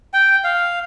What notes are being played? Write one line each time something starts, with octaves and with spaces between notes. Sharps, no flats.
G5
F5